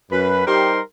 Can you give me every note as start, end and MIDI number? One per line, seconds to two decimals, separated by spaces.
0.12 0.46 42
0.12 0.46 71
0.47 0.79 55
0.47 0.79 63
0.47 0.79 67
0.47 0.79 70
0.47 0.79 72
0.47 0.79 84